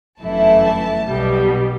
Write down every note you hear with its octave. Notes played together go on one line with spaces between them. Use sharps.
G1 F#2 E3 A3 E4 A5
B1 B2 G3